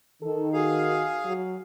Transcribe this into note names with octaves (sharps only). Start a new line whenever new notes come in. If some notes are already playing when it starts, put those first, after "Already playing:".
D#3 A4
F#4 G#4 F5
F#3